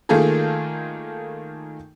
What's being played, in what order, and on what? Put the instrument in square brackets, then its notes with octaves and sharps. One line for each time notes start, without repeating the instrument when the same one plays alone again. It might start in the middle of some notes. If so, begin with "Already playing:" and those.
[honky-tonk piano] D#3 A3 A#3 F4 G#4 A4